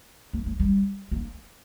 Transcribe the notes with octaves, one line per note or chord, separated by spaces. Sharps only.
A#3
A3
G3
A#3